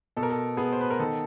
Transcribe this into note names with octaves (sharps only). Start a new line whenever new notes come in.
B2 A4
A#4
A4
B3 G#4
C5
B4
A#4
D#3 A4